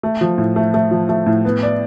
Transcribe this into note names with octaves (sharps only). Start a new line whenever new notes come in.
A3
F3
A2
A3
A3
F3
A3
A2
B3
D5